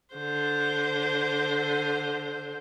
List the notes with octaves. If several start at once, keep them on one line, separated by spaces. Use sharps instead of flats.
D3 C5